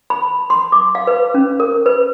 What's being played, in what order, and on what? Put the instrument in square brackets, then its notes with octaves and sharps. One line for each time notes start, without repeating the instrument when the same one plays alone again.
[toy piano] B5
C6
D6
F5
B4
C#4
A#4
B4